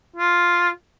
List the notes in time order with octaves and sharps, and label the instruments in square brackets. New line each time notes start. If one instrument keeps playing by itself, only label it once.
[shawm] F4